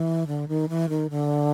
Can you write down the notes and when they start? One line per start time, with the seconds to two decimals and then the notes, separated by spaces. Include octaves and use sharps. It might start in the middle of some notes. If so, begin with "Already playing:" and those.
Already playing: E3
0.27 D3
0.48 D#3
0.69 E3
0.89 D#3
1.10 D3